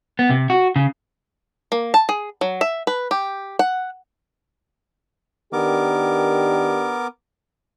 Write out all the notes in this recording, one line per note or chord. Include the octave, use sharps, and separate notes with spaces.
B3
C3
F#4
C#3
A#3
A5
G#4
F#3
E5
B4
G4
F#5
D#3 B3 D4 G4 A#4 D6